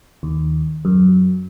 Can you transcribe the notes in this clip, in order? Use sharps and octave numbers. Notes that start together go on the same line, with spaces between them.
D#2
F#2